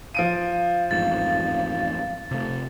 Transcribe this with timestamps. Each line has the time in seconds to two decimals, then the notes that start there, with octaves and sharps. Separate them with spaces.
0.15 F3 F5 D7 D#7
0.91 A1 F2 G#2 A6
2.31 C3 A3